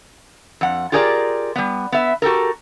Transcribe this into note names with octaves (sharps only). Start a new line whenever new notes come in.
F2 F#5
F4 G4 G#4 A#4 D5
G3 B3
B3 E5
F#4 G4 A4 A#4